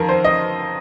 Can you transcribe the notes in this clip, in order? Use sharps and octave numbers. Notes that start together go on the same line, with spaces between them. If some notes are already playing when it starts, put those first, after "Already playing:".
Already playing: F2 D#3 A#4
C5
D#5